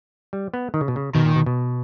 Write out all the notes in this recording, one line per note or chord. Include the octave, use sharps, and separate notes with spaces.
G3
B3
D#3
C#3
B2
C#3
B2 D#3
A#2
B2
B2